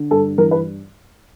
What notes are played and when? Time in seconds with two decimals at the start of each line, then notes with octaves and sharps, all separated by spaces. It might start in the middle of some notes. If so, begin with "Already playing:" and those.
Already playing: D3
0.11 G2 A4
0.38 E3 A#4
0.51 B4